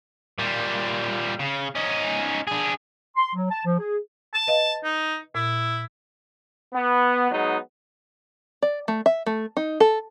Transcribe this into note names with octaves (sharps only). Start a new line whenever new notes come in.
A#2 G3
C#3
C#4 D#4
D4 G#4
C6
F#3
A5
F3
G#4
A5
B4 D#5 F5
D#4
A#2 E4
B3
F#3 G#3 B3 D#4
D5
A3
E5
A3
D#4
A4